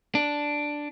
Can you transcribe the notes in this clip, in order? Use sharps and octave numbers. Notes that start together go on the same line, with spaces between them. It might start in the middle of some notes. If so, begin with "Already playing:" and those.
D4